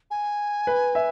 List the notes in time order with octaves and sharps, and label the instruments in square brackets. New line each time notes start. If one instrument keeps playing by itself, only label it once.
[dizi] G#5
[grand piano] B4
E5